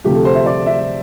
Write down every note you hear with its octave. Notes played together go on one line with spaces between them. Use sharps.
D2 C3 F3 A3 G4
A4
C5
E5
D5
E5